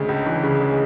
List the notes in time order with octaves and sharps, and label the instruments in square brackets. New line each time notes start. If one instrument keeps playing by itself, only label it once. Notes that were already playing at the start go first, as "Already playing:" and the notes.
Already playing: [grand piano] D2 C#3 G#3
C#2
E3
C#3
G#3